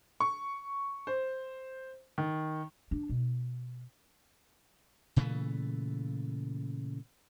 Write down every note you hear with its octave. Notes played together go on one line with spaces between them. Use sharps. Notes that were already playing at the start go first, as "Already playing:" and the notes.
C#6
C5
D#3
D4
B2
A#2 C#3 E3 A3